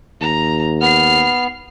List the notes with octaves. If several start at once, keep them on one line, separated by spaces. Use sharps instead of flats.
D#2 A#5
B3 F6 C7